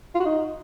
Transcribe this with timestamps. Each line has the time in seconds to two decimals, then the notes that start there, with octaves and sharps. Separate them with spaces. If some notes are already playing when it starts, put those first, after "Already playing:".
0.15 F4
0.20 F#4
0.25 D#4